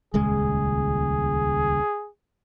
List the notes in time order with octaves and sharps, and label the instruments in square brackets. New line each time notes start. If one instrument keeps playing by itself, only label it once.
[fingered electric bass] D#1 C#2 G#3 [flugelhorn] G#4